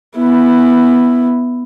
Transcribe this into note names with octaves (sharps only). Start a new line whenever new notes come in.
B3 E4